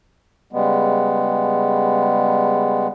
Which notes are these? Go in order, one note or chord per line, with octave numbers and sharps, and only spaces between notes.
C#3 G3 G#3 B3